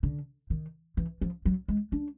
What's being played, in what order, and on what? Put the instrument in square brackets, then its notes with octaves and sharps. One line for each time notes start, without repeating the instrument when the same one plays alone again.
[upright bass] D3
D#3
E3
F3
F#3
G#3
D4